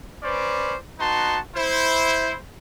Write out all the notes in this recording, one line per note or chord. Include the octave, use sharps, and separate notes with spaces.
C#4 B4 C5 D5
B3 D#4 F#4 A5 C6
E4 C5